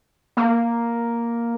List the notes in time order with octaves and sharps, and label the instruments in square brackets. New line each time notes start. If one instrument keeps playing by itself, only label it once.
[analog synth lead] A#3